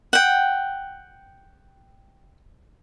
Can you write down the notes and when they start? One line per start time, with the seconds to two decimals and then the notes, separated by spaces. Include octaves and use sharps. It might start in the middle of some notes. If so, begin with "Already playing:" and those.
0.13 F#5 G5